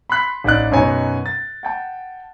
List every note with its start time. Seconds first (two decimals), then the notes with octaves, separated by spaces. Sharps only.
0.10 B5 C6 F#6 B6
0.44 A1 D#4 D5 F#6
0.71 F#2 B2 D#4 C#5 G#5 A#5
1.26 A6
1.63 F#5 G5 A5